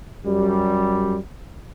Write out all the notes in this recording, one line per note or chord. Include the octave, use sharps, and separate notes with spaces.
F#2 G3